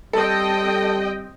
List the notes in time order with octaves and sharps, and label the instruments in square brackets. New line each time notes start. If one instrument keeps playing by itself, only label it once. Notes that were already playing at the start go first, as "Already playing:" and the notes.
[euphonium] G3 [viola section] C4 D#5 G5 [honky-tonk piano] A4